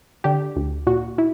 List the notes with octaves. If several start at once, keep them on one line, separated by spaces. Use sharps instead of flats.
D3 G4
D2
A#2 F#4
E4